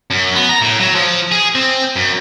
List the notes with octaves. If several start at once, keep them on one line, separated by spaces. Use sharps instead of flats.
F#2
B3
A#5
A2
F#3
F3
G#4
C4
F#2